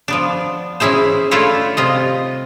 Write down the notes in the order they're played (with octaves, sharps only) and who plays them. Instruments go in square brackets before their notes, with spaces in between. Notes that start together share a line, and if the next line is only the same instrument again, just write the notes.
[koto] F3 B3 D4
E3 C#4 E4 G#4 C5
A3 D4 E4 F4 C#5
C3 F4 D#5